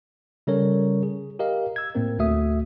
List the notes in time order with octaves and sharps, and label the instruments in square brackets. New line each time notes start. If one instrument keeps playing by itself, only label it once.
[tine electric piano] C#3 G3 C#4 A4 A#4 C#5
G#4
G4 A#4 D#5 F5
E6 G#6
A2 A#3 C4 A#4
D2 A3 F#4 E5 D#6